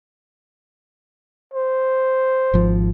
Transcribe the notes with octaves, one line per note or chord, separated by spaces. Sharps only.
C5
G#1 F3